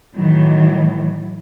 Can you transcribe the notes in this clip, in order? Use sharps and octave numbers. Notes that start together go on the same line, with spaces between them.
A2 D#3 E3 F#3